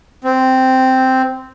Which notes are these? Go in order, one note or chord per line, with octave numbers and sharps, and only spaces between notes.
C4